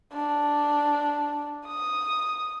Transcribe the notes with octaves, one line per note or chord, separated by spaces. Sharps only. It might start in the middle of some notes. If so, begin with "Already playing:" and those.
D4
D#6